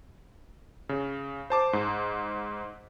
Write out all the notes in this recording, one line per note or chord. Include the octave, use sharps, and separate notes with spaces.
C#3
C5 A5 D6
G#2